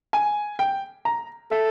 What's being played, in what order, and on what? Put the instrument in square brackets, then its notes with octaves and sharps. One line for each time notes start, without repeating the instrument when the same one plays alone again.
[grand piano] G#5
G5
A#5
[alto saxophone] A4 [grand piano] E5